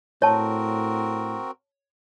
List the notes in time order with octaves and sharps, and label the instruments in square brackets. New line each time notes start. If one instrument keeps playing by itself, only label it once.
[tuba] A2 [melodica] C4 F#4 A#4 [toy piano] C#5 A5